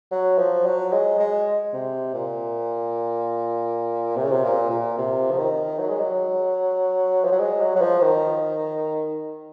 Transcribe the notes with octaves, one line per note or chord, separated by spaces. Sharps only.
F#3
F3
F#3
G#3
G#3
C3
A#2
C3
C#3
C3
A#2
A#2
C3
F3
D#3
F#3
G#3
F#3
F3
F#3
G#3
F#3
F#3
F3
D#3